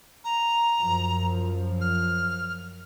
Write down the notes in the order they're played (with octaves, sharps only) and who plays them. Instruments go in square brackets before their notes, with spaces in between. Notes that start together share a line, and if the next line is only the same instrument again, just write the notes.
[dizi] A#5
[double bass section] F#2 F3
[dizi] F6